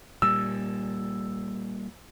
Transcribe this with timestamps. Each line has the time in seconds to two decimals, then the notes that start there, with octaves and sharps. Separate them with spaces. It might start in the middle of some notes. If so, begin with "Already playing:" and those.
0.22 A#2 G3 E6